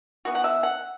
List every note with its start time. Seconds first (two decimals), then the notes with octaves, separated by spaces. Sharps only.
0.25 E3 B3 F#4
0.35 F#5
0.44 E5
0.63 F#5